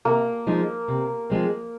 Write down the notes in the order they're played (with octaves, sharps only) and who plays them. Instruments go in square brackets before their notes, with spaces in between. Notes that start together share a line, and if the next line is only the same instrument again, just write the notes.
[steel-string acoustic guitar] C3 [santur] A#3
[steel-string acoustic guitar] F3 G#3 D#4
C3
F3 G#3 C4